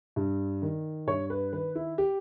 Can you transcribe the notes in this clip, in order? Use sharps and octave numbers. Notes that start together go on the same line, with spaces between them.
G2
D#3
G2 C#5
B4
D#3 B4
E4
G4